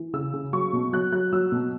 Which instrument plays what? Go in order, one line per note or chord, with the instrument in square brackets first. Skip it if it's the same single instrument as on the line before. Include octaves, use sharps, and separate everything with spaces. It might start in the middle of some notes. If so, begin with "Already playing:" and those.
Already playing: [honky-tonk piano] E3
C#3 E6
C#3
F#3 C#6
B2
F#3 F#6
F#3 F#6
F#3 E6
B2